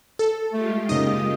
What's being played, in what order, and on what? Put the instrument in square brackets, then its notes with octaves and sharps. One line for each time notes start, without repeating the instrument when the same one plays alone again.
[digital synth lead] A4
[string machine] G#3 F4 G4 [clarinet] A3
[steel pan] C#3 A#3 D#4 [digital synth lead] D#5 [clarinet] D#6